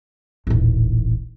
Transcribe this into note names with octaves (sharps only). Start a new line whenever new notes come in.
D#1 A1